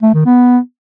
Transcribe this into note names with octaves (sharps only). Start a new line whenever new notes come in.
A3
D#3
B3